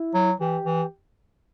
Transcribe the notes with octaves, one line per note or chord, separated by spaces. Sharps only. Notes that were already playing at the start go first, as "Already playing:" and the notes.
Already playing: E4
F#3
E3 G4
E3